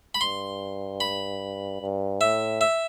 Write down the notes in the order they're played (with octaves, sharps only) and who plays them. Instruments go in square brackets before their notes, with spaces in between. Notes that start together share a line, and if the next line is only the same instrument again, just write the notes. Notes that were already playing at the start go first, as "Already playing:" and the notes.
[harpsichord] B5
[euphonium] G2 [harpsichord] C6
[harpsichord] B5
[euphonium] G2
[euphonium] A2 [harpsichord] E5
[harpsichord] E5